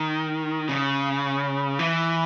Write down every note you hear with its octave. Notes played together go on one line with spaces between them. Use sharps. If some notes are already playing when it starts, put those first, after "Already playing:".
Already playing: D#3
C#3
E3